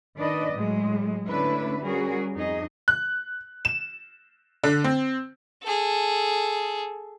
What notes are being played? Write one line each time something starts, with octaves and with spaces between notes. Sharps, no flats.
D#3 D4 B4 D5 D#5
A2 F#3 G#3
D3 A3 C#4 D4 E4 B4
G3 C#4 F#4 G#4 A#4
F2 D#4 G#4 D#5
F#6
E7
D3
C4
G#4 A4